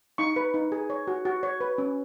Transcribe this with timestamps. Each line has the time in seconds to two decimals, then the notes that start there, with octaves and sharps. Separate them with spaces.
0.18 D#4 C#6
0.36 B4
0.54 D#4
0.72 G#4
0.90 C#5
1.07 F#4
1.25 F#4
1.43 C#5
1.61 B4
1.78 C#4